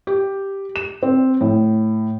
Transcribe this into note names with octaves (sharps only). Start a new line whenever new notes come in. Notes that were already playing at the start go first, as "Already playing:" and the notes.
G4
E7
C4
A2